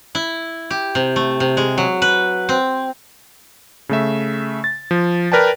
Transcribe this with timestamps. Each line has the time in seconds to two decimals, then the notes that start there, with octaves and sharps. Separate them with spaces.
0.15 E4
0.70 G4
0.95 C3
1.16 A3
1.40 C3
1.57 G#3
1.78 F#3
2.02 B4
2.49 C4
3.89 C#3 A3 E5
4.64 A6
4.91 F3
5.32 A#4 B4 D5 G5 A5